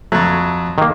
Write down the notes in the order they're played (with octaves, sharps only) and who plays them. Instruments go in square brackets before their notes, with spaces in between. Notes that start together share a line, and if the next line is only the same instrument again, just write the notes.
[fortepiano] F2 F#3 [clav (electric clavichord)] A3
[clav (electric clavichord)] D#3 A#3